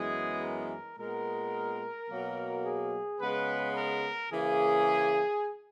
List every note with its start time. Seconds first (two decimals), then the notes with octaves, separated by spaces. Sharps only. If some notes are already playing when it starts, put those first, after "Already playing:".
Already playing: F#2 E3 G#3 B3 G#4
0.42 A#4
0.98 A#2 G#3 B3 A#4
2.09 B2 F#3 A#3
2.65 G#4
3.21 C#3 G#3 B3 B4
3.76 A#4
4.32 C#3 E3 A#3 G#4